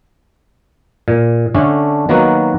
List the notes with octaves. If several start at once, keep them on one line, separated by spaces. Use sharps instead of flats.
A#2
D3 A3 C#4 D4
D#3 F#3 A#3 B3 F#4